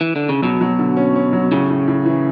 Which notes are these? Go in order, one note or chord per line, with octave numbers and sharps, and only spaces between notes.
E3
D3
C#3
B2 F#3
F#3
D3
C#4
C#4
F#3
A2 C#3
A2
A2
E3